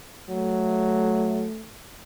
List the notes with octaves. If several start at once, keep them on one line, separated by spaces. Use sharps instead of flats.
F#3 A3